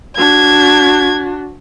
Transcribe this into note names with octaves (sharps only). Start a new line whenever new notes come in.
D4 F#4 G#6